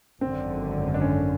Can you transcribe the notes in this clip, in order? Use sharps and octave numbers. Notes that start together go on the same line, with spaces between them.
G#1 F#2 D3 C4
D4
C#4